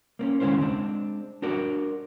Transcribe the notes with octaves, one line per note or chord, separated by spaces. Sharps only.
A#3 C4 C#4
D#2 C#3 G#3 C#4 E4 C5
G#3 C4 D4
D4 F#4 A#4 D5